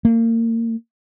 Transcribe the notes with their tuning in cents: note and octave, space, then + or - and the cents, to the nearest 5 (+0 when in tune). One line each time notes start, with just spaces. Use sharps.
A#3 -30